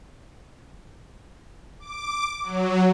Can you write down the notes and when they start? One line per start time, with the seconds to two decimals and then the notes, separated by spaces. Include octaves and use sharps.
1.80 D6
2.43 F#3